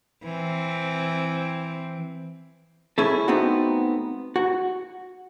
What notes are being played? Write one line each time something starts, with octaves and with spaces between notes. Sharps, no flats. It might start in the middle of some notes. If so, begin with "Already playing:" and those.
E3 C4
C#4 E4 G#4 A4
A3 B3 C4 D#4 F#4
F#4